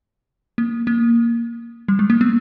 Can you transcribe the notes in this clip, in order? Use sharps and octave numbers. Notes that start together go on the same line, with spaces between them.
A#3
A#3
G3
G#3
A#3
B3